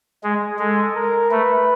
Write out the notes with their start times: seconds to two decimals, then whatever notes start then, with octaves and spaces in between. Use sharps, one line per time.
0.24 G#3 G#4
0.59 G#3 A4
0.95 A#4
1.31 A3 B4